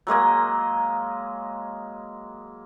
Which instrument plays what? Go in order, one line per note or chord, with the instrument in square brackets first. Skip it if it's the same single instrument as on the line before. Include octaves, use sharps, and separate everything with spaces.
[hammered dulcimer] F#3 G#3 A#3 D#5